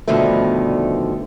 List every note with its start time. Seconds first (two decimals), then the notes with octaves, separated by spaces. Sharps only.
0.08 G2 B2 D3 D#3 F3 A3